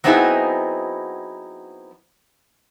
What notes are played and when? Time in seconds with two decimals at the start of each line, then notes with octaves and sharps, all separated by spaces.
0.04 F#3 B3 C4 D#4 E4 G#4